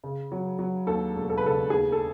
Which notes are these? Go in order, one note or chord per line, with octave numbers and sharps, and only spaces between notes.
C#3
F#3
F#3
D#2 A4
E1
A4
B4
C#3 A4
D#2 G#4
A4